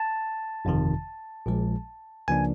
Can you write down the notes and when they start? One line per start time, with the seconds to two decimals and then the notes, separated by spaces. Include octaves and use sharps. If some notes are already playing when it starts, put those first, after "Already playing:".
Already playing: A5
0.65 G1 F2 C3 D#3
1.46 A#1 A#2 F3 G#3
2.28 C#2 C#3 F3 A#3 D4 G#5